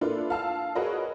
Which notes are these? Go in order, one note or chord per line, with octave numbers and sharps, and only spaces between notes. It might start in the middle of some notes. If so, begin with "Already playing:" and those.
A#3 D4 E4 F4 A4 B4
F5 A5 E6
F#4 G#4 A#4 B4 C#5 D#5